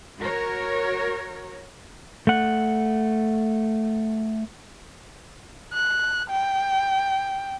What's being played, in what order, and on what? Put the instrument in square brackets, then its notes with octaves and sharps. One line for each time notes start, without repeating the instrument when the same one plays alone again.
[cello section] F#4 A#4 C#5
[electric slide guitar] A3 F#5
[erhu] F#6
G5